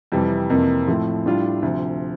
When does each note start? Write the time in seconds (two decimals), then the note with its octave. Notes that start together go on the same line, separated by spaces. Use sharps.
0.12 F2 C3 E3 G3
0.50 F2 C3 E3 A#3
0.88 A2 F3 A3 C4
1.26 A2 G3 D4 F4
1.62 D2 C3 F3